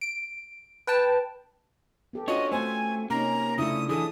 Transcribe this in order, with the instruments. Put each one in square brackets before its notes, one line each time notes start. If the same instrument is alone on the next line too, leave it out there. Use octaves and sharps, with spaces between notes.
[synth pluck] D7
B4 G5 A5
[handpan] B3 G4 A4
[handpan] C#4 F4 F#4 [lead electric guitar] D4 C#5 [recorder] D#5
[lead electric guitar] A3 [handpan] C4 C5 [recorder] G#5
[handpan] C3 C#4 D#4 [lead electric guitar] A#3 [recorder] A#5
[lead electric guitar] C#3 A3 [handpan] D4 E4 F4 [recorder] D#6
[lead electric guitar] D3 E3 [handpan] G#4 A4 [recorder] D#6